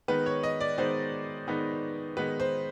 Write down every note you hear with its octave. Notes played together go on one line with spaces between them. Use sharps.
D#3 G#3 B3 D#4 B4
C#5
D#5
D5
D#3 G#3 B3 D#4 C5
D#3 G#3 B3 D#4
D#3 G#3 B3 D#4 B4
C5